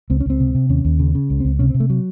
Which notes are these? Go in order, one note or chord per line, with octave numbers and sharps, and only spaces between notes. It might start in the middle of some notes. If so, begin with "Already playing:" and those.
C#2 C4
C#4
C#2 C4
C3
C3
D#2 C#4
D#2
C#3
C#3
C#2
C#2 C4
C3 C#4
C3 C4
A3
F#3